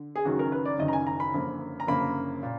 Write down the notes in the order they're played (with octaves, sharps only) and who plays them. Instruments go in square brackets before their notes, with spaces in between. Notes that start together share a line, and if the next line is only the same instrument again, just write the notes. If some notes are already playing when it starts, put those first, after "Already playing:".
Already playing: [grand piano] D3
G#4
F#1 F#2 D#3 F#4
A#4
B4
D5
F#1 F#2 D#3 D#5
A#5
G#5
A#5
B5
F#1 F#2 D3 F3 A#3
A#5
F#1 F#2 D3 F3 A#3 B5
A#2